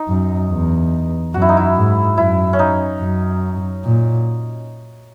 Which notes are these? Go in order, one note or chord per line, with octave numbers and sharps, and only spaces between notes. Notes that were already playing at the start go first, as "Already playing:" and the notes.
Already playing: D#4
F#2
E2
F#2 F#4
E4
D#4
E4
G#2
F#2 E4
C#4
D#4
F#2
A#2